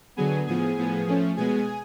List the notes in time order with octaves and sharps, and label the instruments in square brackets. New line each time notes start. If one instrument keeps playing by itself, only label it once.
[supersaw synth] D3 F#3 B3 G#4 G#5
A2 F3 B3 G#4 G#5
A2 F3 B3
F3 A3 C#4
B2 G#3 B3 G#4 G#5